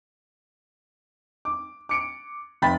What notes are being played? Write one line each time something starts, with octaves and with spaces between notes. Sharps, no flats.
D6
D6 C#7 D7
F1 G5 B5 A6